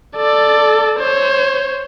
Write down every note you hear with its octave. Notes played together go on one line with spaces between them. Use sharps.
A4 D5
C5 C#5